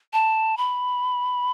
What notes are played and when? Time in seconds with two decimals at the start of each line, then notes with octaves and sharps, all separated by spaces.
0.13 A5
0.57 B5